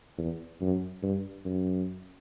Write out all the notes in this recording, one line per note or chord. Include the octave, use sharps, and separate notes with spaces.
E2
F#2
G2
F#2